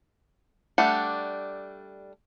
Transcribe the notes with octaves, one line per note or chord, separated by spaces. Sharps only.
G3 A3 D4 F#5